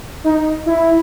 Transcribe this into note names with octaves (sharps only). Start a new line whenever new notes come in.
D#4
E4